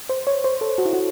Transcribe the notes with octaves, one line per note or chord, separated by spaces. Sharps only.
C5
C#5
C5
A4
F#4
E4
F#4